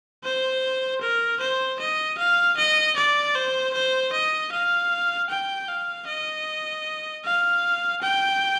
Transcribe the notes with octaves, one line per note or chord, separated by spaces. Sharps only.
C5
A#4
C5
D#5
F5
D#5
D5
C5
C5
D#5
F5
G5
F5
D#5
F5
G5